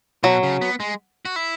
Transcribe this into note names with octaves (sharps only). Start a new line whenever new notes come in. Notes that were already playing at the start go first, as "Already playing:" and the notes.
B2 F#3
C#3
B3
G#3
F#4
E4